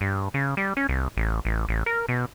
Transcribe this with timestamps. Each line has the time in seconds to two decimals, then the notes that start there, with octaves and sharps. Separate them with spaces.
0.01 G2
0.34 C#3
0.57 G3
0.77 C#4
0.89 C2
1.17 A1
1.45 A1
1.69 A1
1.86 A#4
2.09 B2